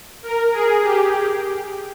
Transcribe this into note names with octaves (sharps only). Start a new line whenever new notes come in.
A#4
G#4
G4